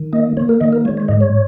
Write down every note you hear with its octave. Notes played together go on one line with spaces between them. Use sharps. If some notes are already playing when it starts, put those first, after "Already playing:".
Already playing: D#3
A#3 D#5
A#3 C#5
A#4
D#3 D#5
A#4
G#3 C#5
C#5
G#2 D#5
C#5